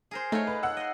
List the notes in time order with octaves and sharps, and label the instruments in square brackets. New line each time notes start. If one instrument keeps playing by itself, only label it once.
[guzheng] G#4 A#4 C5
[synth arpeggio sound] A3 [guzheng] D#4 F4 C#5
[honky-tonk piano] B4
F#5 E6
[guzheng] D#5 C6